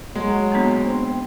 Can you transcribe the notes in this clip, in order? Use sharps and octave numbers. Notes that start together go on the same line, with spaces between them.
F#3 G#3
A#3 B3 D4
C4